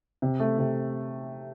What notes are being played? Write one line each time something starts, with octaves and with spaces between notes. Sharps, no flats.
C3
A3
C3